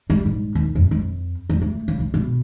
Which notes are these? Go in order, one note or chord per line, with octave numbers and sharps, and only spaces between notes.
G3
G#2
D#2
F2
F2
E2
A3
C#3
C2
B2